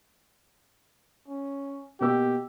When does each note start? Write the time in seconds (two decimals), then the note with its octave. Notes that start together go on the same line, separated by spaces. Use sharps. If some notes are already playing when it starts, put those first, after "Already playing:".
1.28 C#4
2.01 B2 A#3 G4 E6